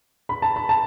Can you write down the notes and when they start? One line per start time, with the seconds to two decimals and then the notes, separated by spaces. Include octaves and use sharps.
0.29 B5
0.42 A5
0.56 B5
0.69 A5